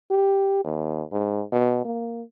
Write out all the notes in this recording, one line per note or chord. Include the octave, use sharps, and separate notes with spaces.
G4
D#2
G#2
B2
A#3